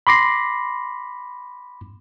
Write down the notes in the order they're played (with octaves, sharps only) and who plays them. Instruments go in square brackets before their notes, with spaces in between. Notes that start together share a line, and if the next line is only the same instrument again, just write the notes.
[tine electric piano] B5 C6 D6 A#6 C7